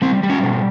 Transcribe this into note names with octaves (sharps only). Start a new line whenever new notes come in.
G3 C4
G3
C#4
B2